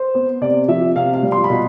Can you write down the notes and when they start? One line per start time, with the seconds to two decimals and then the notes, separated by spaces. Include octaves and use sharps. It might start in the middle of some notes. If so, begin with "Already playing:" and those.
Already playing: C5
0.15 B3
0.41 C3 D5
0.68 F3 E5
0.96 C3 F5
1.14 F5
1.23 G3
1.32 C6
1.44 B5
1.50 B2